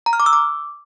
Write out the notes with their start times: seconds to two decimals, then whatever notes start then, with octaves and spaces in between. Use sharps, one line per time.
0.06 A#5
0.13 F6
0.20 D6
0.26 E6
0.33 D6